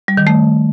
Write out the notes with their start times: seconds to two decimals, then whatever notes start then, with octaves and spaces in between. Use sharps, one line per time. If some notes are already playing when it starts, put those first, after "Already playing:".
0.08 G3
0.17 D#3
0.27 A3